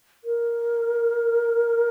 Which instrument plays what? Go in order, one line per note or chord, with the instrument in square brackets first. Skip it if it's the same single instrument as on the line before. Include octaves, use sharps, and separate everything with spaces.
[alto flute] A#4